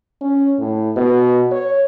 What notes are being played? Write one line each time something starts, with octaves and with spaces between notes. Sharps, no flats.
C#4
A2
B2
C#5